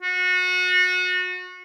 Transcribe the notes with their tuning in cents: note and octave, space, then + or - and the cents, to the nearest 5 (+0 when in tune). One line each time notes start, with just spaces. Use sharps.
F#4 -30